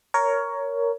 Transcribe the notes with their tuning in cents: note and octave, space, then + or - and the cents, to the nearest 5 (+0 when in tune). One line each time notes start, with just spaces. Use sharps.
A#4 +0 C#5 +15